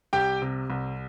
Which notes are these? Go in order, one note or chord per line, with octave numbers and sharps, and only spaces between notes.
C2 G4 G5
C3
C2